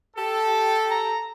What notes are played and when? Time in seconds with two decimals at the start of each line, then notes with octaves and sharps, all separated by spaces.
0.16 G4 A4
0.91 A#5